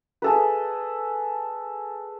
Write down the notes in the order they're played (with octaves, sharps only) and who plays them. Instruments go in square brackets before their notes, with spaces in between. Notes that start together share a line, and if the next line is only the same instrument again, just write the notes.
[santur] G#4 A4 B4